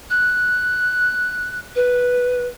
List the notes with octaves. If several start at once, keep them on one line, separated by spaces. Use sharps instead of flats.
F#6
B4